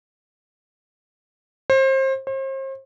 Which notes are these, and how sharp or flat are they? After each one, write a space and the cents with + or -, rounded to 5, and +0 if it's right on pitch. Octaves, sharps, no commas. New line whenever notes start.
C5 +30
C5 +40